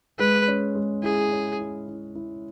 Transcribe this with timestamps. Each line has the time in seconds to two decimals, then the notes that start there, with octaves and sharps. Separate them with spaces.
0.19 G#3 B4
0.48 C#4
0.75 G#3
1.03 E4 G#4
1.32 C#4
1.60 E4
1.88 E4
2.15 E4